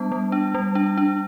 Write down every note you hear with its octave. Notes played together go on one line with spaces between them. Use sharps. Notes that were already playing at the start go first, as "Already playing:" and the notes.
Already playing: G3 B3 D4 A5
G3
D4
G3
D4
D4